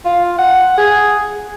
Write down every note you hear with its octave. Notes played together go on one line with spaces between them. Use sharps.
F4
F#5
G#4